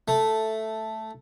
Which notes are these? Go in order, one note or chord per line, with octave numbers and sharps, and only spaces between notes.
A3